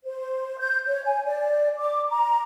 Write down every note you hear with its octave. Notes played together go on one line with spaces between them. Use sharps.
C5
G6
C#5
G#5
D5
D6
A#5